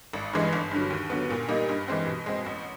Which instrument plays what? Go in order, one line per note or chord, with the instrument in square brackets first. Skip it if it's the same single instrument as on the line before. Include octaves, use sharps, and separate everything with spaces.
[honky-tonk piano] G#1
G2 E3 G#3
G1
G2 D3 F#3
D#2
D3 F#3 B3
A#2
G3 A#3 D#4
G2
E3 G#3 C4
B2
G#3 C4
A1